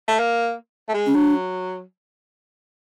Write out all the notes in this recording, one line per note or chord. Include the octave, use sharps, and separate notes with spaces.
A3
A#3
A3
G#3
C#4
F#3 D4